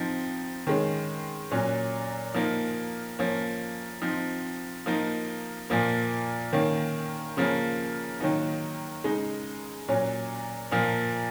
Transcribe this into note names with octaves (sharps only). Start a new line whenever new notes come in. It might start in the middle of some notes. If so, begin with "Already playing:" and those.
Already playing: F3 C4 D#4
D#3 G#3 C#4
A#2 F#3 C#4
F3 A#3 D#4
F3 A#3 C#4
F3 C4 D#4
F3 A#3 D#4
A#2 F3 A#3
D#3 A#3 C#4
C#3 F3 A#3 C#4
D#3 F#3 A#3 D#4
C#3 G#3 D#4
A#2 F#3 C#4
A#2 F3 A#3